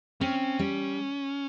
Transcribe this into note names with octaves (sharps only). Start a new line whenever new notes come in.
C4 C#4
G3